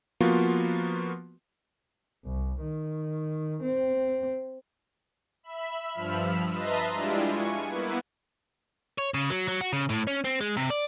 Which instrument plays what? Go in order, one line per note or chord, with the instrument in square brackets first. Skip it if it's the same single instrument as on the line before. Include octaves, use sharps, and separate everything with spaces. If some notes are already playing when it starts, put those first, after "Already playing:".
[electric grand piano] F3 A#3 B3 F4 F#4
[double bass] C2
D#3
C4
[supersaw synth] E5 B5
G2 F3 B5 E6 F6
B4 D#5 E5 A5 A#5 C6
G3 G#3 D4 E4 F4
G#5 C#6
A#3 B3 E4 B4
[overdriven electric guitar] C#5
C#3
F#3
F#3
F#4
C#3
A2
C#4
C4
G#3
C3
D5